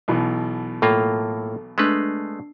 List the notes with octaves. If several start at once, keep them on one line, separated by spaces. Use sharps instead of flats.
B1 B2 E3
A2 A#3 F4 A4
G#3 A3 D4 B4 C7